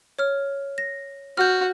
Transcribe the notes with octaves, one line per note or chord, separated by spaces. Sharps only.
C#5 F6
A#6
F#4 F6 G6